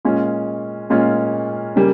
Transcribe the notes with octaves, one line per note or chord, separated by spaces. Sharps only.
A#2 G#3 C#4 F4
A#2 G#3 C#4 F4
C#3 G3 A#3